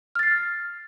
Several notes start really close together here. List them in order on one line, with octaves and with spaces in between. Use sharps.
F6 A6 C7